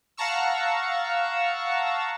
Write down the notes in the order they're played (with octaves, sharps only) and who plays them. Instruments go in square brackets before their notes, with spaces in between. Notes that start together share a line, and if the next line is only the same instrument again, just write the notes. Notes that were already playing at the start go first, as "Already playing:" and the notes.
[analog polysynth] F5 F#5 A5 A#5 C#6 E6